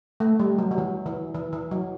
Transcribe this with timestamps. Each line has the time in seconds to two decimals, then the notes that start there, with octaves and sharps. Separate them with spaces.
0.20 A3
0.40 G3
0.58 F#3
0.71 F#3
0.78 E3
1.06 E3
1.34 E3
1.53 E3
1.71 F#3